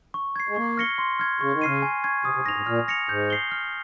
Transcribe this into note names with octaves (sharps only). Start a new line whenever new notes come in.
C#6
G#6 C7
G#3
A#3 C#6
F6 A#6 C#7 G7
C6
F6 G#6
C#3 C#6
D#3
C#3 F6 C7 D#7
G#5
C#6 G#6
C3 D#6
C3
G#2 A#6 F7
G#2
A#2 F6
A#6 C#7 F7
G#2 G6
C7 G7
F6